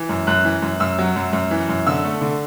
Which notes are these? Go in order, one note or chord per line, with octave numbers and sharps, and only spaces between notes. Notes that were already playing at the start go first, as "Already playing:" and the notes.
Already playing: E3
F#2
F#2 F#6
E3
F#2
F#2 E6
F#3
F#2
F#2
E3
F#2
D3 E6
A3
D3